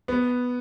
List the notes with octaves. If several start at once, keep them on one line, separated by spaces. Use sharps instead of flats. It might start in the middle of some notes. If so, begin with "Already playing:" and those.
B3